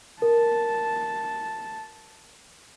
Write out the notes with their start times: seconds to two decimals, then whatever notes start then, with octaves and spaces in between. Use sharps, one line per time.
0.22 A#4 A5